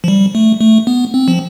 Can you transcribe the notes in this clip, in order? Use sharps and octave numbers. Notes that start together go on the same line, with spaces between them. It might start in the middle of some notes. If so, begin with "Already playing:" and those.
F3
G3
A3
A3
B3
C4
F3